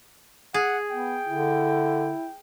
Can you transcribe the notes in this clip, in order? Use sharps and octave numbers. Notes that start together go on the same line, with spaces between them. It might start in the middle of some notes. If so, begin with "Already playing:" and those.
G#4 F#5
B3 G5
D3 E4